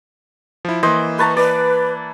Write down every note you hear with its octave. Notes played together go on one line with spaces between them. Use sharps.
F3 E4
E3 A#3 C5 D#5
B4 A5 A#5 C#6
B4 D5